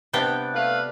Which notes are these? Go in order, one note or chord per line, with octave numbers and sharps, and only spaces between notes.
C3 G3 B3 D4 G5
A3 B4 F5